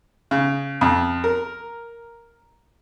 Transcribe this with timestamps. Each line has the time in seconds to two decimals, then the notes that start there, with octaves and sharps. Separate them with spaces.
0.31 C#3
0.81 F2
1.24 A#4